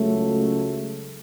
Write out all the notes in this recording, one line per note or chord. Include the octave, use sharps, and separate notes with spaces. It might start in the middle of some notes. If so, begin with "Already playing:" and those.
Already playing: C#2 C#3 F#3 A3